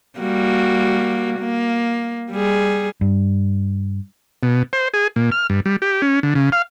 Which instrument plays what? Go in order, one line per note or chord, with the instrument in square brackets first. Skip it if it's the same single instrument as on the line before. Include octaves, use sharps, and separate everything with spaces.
[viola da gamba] G3 A#3 F#4
A#3
G3 G#4
[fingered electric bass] G2
[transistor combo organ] B2
C5
G#4
A#2
F6
G2
G3
G4
C#4
D3
C#3
F5